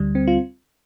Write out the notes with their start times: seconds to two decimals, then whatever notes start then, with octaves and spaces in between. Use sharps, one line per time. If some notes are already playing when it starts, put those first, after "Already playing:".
Already playing: D2 D3 G3
0.15 C4
0.27 F4